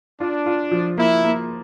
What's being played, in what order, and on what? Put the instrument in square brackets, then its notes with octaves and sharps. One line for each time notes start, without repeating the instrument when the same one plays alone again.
[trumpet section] D4 [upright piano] F4
[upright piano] F4
F3
[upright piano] A#3 [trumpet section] E4
[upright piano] A#3